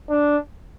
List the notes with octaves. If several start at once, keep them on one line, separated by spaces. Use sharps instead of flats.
D4